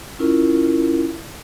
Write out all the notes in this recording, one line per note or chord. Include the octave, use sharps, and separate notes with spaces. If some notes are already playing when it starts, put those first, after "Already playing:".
C#4 E4 F4 A#4